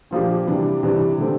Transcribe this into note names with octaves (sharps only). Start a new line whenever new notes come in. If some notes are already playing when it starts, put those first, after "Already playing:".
A#2 F3 A#3 D4 G4
C3 E3 G3 D4
C3 E3 G3 D4
D3 A3 C4